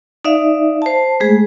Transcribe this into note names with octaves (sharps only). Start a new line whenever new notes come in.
D#4 D5 E5 F5
C5 A5
G#3 A3 G#4